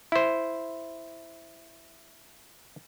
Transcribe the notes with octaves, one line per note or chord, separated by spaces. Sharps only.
E4 C5